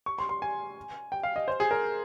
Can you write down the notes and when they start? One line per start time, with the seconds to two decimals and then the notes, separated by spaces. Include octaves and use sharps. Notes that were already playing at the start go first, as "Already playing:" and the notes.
0.06 C#6
0.19 C6
0.29 C6
0.42 G#5
1.12 G5
1.23 F5
1.36 D#5
1.48 C5
1.60 G#4
1.71 A#4